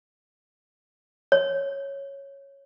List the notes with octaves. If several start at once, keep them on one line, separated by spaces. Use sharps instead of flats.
C#5